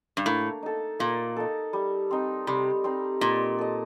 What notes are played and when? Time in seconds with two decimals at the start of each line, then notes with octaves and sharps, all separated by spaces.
0.17 G2
0.26 A2 A#3
0.63 D#4 A4
0.99 A#2 A#3
1.36 D#4 A4
1.73 G3
2.11 C4 D#4
2.47 C3 G3
2.84 C4 D#4
3.21 A#2 D#4
3.58 A4 D#5